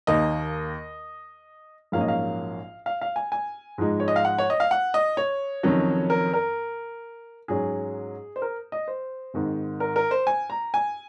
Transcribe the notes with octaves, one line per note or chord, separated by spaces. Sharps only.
D#2 D#3 A#3 D#5
A#1 G#2 F#3 A#3 C#4 F5
D#5
F5
F5
F5
G#5
G#5
G#2 F3 G#3 D#4
C#5
D#5
F5
F#5
C#5
D#5
F5
F#5
D#5
C#5
F1 F2 D#3 F#3 C#4
A#4
A#4
G#2 F#3 C#4 G#4
C5
A#4
D#5
C5
G#1 G#2 D#3
A#4
A#4
C5
G#5
A#5
G#5